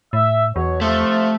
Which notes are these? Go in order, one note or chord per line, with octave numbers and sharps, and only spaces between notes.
A2 E5
E2 B2 F#3 C#5
C3 F3 A3